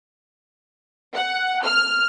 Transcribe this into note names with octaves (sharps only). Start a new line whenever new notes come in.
F#5
F6